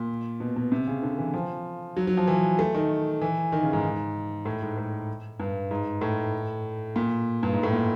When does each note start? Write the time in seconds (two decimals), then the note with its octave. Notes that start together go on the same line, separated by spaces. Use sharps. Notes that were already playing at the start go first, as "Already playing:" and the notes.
Already playing: A#2
0.40 B2
0.56 B2
0.72 C3
0.87 C#3
1.03 D3
1.18 E3
1.34 F3
1.97 F#3
2.07 F#3
2.17 F3
2.27 E3
2.59 A3
2.74 D#3
3.21 E3
3.52 D#3
3.63 C#3
3.73 G#2
4.45 A2
4.62 G#2
4.77 A2
5.40 G2
5.71 G#2
6.01 A2
6.96 A#2
7.43 G2
7.53 G#2
7.63 A2
7.73 A#2